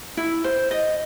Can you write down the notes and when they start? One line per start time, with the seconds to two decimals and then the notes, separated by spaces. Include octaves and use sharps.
0.17 E4
0.44 C5
0.71 D#5